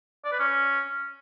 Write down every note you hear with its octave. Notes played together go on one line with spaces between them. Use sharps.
D5
B4
C#4